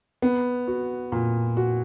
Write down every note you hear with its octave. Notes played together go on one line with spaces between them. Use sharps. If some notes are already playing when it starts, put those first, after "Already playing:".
B3
F#4
A#2
F#4